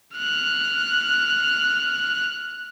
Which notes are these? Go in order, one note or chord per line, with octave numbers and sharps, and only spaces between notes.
F6 F#6